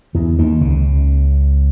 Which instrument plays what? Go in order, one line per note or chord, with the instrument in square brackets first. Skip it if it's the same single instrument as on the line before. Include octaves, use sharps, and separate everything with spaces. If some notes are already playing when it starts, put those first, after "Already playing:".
[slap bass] E2 E3
D#2 D#3
C#2 C#3